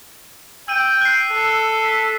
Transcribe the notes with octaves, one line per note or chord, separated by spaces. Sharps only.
G5 E6 D#7
F#6 C7
A4
B6